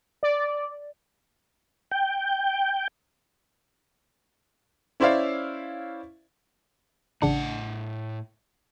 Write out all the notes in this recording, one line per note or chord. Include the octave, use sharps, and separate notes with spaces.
D5
G5
C#4 E4 C5 D5 E5 F5
A1 A2 C#3 D4 F#5